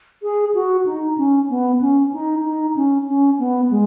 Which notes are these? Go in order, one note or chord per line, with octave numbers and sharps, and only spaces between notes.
G#4
F#4
D#4
C#4
B3
C#4
D#4
D#4
C#4
C#4
B3
G#3